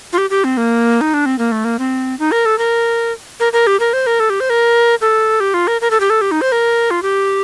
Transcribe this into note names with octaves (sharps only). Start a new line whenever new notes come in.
F4
G4
G4
C4
A#3
D#4
D4
C4
A#3
A3
A#3
C4
D#4
A#4
A4
A#4
A#4
A#4
G4
A#4
C5
A#4
A4
G4
C5
A#4
A4
G4
F4
A#4
A#4
A4
G4
A4
G4
D#4
C5
A#4
F4
G4